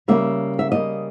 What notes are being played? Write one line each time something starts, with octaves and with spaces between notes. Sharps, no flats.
C#3 G3 A#3 E5
E5
C#3 G3 A#3 D#5